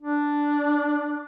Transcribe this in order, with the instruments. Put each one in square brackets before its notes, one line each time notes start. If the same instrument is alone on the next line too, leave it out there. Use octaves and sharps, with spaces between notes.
[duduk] D4